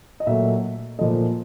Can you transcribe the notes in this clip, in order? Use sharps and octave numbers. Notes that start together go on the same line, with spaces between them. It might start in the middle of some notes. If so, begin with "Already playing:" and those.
D#5
A#2 F#3 A3 E5
A#2 F3 A3 D#5